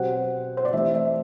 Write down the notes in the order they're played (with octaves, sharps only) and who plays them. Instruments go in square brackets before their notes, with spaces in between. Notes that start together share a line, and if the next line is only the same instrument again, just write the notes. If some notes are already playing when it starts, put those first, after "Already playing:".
Already playing: [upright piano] B2 F#3 C4 G4 C5 [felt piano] F#5
[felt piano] C5
D5
[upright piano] E3 A3 C4 G4 [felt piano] E5
[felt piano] E5